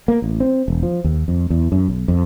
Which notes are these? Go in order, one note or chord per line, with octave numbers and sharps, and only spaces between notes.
A#3
A1
C4
E1
F3
D#2
F2
E2
F#2
B1
F2